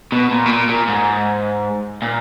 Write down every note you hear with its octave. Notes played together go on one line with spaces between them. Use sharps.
B2
A#2
B2
A#2
A#2
G#2
A#2